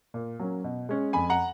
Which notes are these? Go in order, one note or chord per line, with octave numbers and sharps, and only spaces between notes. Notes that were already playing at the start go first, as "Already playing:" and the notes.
A#2
F#3 A#3 C#4
B2
G#3 C#4
F2 G#5 B5
F#5 A#5